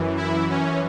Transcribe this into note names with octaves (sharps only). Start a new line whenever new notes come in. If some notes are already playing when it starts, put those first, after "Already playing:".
Already playing: F#2 E3
E4
C#4